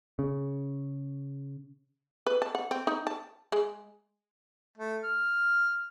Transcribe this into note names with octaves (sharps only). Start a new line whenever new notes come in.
C#3
B4
A5
F#5
C4
D#4
A5
G#3
A3
F6